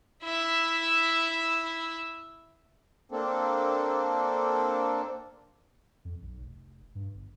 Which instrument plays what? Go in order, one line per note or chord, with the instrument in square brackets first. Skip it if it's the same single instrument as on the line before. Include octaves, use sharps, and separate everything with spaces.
[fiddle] E4 E5
[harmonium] A#3 C4 D4 A4
[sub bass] F2
B1
F1
G2
G1